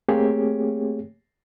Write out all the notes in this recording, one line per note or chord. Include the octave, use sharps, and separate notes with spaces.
A3 A#3 C4 G4 G#4 C#5